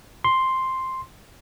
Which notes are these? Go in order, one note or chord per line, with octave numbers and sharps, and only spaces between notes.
C6